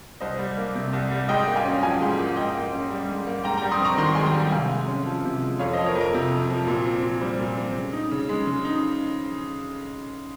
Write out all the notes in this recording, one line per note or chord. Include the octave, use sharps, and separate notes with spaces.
C2 C5 D#5
G3
A#3
C3
C2
G3
G#2 D#5 G5
A#3
F5 G#5
C#4
F3 F5 G#5
G#2
A#3
G#2 D#5 G5
A#3
C#4
G3
G#2
A#3
G#2 G5 A#5
G3 G5 A#5
C6 D#6
C4 A#5 C#6
D#3 C6
C#6
G#2 G#5 C6
G5 A#5
G3
C3 F5 G#5
G#3
C#4
F3
C3
G#3
F2 C#5 F5
F3 C5 D#5
A#4 C#5
F2
A#4
C3
F2
F3
A#2
C4
A#2
G3 C5
A#2
C4
C#3
D#4
C#3
G#3
C#3
D#4